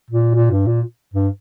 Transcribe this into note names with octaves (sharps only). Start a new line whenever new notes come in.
A#2
A#2
G2
A#2
G2